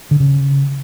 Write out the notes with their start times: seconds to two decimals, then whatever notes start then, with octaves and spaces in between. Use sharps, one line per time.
0.11 D3
0.20 C#3